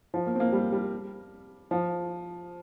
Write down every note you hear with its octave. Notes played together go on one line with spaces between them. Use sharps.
F3
A#3
C4
A#3
G3
G3
F3